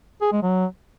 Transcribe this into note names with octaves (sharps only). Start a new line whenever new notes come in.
G#4
G#3
F#3